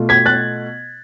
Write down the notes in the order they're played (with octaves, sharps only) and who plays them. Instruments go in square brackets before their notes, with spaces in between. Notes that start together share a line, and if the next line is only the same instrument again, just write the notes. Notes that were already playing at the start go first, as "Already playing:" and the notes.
Already playing: [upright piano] B2 A3 F4
G#6 B6
F#6 A6